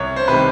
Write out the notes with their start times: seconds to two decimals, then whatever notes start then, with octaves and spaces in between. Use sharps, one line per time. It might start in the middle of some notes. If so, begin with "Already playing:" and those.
Already playing: C2 C#5
0.16 C5
0.28 C3 D#3 G3 B4